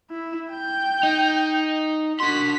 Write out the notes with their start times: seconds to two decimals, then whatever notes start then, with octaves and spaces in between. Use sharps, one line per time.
0.10 E4
0.53 G5 G6
1.03 D#4
2.20 D4 F#4 C6 B6